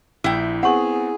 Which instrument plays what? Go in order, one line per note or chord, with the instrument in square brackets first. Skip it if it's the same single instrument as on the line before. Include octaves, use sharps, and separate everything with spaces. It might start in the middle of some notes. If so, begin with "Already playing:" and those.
[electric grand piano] A#1 [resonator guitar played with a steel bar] E4 G5
[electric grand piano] B3 C4 [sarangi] G#4 [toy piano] F#5 C#6